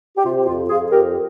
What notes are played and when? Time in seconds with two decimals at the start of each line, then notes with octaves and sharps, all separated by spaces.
0.17 G4
0.24 C3 F4
0.36 G4
0.46 F2 F4
0.58 G4
0.69 F2 F4 G#4
0.92 F2 G4 A#4